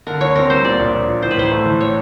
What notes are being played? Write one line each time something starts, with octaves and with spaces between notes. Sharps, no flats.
D3 A#4
D2 C#5
C4 A#4
G3 C5
A#2 D5
A#1
A#1
F3
A2 C5
B4
A1 C5
A3
E3
C#5